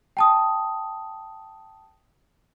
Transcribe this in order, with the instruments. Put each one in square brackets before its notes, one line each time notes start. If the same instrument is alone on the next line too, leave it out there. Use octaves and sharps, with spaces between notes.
[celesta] G5 A5 D#6